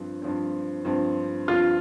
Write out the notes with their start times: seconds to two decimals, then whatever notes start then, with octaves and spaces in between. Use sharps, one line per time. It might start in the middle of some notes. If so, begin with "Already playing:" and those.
Already playing: G2 F3 C4
0.22 G2 F3 C4
0.85 G2 F3 C4
1.48 G2 F3 C4 F4